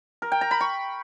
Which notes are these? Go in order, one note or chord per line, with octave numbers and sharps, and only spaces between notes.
A#4
G5
A#5
B5
C#6